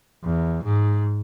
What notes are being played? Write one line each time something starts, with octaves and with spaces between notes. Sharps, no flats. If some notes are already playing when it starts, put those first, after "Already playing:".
E2
G#2